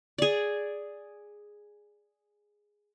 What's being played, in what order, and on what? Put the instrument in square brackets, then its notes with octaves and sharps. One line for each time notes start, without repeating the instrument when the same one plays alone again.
[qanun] G#4 D5